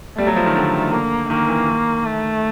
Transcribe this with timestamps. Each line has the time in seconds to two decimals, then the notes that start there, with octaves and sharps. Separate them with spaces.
0.18 G3 A3
0.27 F#3
0.36 F3
0.46 D#3
0.56 D3
0.93 A#3
1.30 D#3 A#3
1.48 E3
1.67 D#3
2.05 A3